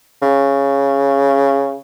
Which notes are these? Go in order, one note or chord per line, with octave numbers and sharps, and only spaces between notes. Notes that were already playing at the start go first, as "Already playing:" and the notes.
C#3